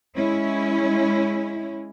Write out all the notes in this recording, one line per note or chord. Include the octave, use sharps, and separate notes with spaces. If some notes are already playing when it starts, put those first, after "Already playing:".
G#3 C#4 E4